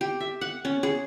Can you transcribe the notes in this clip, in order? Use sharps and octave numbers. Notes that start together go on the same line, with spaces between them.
G4
E5
F#5
C#4
G#4